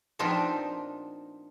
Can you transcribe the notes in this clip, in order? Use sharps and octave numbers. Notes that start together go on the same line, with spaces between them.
A#2 F3 B3 C4 D4 D#4